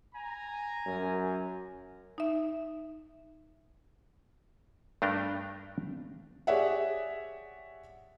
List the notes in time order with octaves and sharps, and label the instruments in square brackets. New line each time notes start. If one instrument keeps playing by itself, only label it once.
[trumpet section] G#5 A#5
[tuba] F#2
[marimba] D#4 E5
[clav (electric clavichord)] G2 A3 D4 A#4 G5
[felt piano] G4 G#4 C#5 D5 E5 F#5